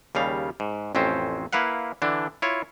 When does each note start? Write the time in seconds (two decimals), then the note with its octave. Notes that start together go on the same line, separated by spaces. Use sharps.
0.15 D#2 C#3 G3 F5
0.60 G#2
0.95 A1 F2 C4 C#4 C5
1.53 A#3 E4 B4 F5 F#5
2.02 D3 E3 D4
2.42 E4 F4 C#5